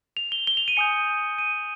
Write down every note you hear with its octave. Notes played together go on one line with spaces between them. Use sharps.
F7
G7
G7
F7
D#7
G#5 D#6 G6 C#7
D#7